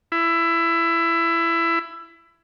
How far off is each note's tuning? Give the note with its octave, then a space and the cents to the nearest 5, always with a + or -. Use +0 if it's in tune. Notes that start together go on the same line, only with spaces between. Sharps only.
E4 +20